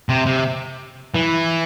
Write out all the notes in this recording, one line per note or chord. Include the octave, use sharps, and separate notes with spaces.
C3
C3
E3